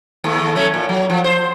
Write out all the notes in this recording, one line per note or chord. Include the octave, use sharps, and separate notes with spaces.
D#2 A3
F#3 A3 C#4
A#2
F#3
F3
C5